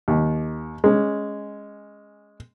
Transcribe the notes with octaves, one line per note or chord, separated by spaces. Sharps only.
D#2
G#3 C#4